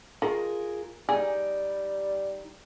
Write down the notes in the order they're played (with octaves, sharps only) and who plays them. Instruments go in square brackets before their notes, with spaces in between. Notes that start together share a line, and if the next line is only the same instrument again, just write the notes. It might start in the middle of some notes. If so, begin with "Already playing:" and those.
[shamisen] D#3 [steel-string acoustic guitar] F4 G#4 A#4
[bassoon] G3 [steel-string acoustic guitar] D#4 D5 G5 [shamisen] G#4